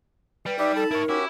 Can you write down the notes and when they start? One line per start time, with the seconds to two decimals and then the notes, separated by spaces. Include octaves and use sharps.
0.46 G3 B4
0.59 D#4 G4 B4 D5 E5
0.76 A4 A5 B5
0.91 E4 A#4 C#5
1.09 C#4 E4 F#4 G4